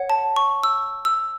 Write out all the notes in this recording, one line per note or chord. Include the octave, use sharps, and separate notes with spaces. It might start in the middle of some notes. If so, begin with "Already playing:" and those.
Already playing: C#5 F#5
A5
C#6
E6
E6